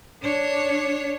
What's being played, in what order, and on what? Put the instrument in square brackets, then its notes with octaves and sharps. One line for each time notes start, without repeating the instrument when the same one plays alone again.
[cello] D4 C#5